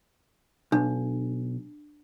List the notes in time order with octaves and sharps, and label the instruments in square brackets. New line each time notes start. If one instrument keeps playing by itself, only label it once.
[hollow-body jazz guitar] B1 [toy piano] D4